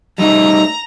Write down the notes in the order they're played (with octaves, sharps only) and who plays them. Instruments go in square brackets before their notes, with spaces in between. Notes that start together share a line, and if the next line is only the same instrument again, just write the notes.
[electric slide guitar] G3 A3 D#4 [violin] A#5